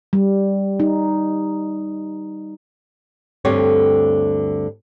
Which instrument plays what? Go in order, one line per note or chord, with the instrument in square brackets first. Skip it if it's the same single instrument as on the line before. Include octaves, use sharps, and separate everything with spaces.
[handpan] G3
D#4
[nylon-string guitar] D2 G2 D3 C4 G4 C#5